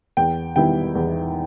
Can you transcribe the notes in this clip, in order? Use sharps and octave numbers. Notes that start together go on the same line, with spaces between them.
E2 G5
D#3 G3 B3 E4 G5
E2